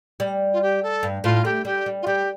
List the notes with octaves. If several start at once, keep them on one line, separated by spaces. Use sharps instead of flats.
G3
F4
G4
A4
G2
A2 F4
A3 G4
G3 G4
G3
F4
G3 G4